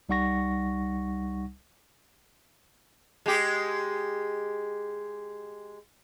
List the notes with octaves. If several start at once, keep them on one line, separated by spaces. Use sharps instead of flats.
C2 G3 D#4 F#5 C#6 A#6
G#3 G4